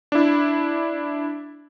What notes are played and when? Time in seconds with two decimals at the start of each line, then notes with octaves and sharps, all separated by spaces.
0.12 D4 E4